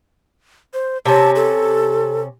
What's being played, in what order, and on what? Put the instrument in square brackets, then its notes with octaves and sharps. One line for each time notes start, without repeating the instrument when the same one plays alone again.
[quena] C5
[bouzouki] C3 C#4 [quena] A5
[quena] A4